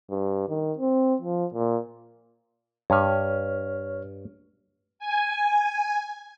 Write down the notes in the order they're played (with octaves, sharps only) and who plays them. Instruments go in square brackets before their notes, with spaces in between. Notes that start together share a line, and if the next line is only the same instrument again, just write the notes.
[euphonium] G2
D#3
C4
F3
A#2
[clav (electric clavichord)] G2 [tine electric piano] C#5 F6
[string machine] G#5